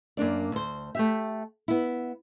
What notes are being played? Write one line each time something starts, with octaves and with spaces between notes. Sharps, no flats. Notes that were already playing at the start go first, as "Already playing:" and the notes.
F#2 A#3 D4 D5
D2 C5
A3 G4 E5
B3 E4